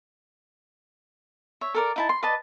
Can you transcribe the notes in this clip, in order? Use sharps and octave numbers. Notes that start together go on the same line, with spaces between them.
C#5 E5
A4 A#4 D5
D#4 E4 A5
C6
B4 D5 D#5 A5